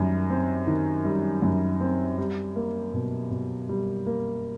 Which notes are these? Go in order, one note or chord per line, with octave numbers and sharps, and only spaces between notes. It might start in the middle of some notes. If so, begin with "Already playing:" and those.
Already playing: F#2 D#3 G3
C4
D#3
G3
F#2
C4
G3
A#3
B2
B2
G3
A#3